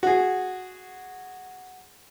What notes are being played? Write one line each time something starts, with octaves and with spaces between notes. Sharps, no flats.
F#4 G#4